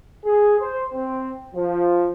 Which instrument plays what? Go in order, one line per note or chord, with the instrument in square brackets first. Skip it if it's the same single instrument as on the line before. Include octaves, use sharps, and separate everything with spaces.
[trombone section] G#4
C5
C4
F3